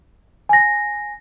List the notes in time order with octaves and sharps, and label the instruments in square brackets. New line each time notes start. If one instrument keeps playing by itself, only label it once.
[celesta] G#5 A#6